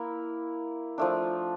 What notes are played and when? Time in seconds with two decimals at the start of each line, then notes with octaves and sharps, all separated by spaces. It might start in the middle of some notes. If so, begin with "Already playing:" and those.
Already playing: A#3 E4
0.98 F3 A3 D4